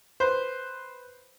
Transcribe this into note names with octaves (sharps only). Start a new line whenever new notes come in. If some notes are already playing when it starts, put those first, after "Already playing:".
B4 C5